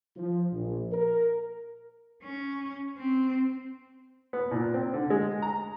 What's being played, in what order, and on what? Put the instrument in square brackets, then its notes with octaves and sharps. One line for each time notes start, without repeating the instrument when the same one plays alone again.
[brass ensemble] F3
A#1
A#4
[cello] C#4
C4
[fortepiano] B3
A#2
C4
D3
G#3
A#5